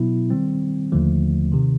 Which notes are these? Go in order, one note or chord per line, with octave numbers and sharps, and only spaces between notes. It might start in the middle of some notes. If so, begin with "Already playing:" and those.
Already playing: B2 F#3 B3 E4
D#3 G3 C4
D#2 D3 F3 A3
C3 D#3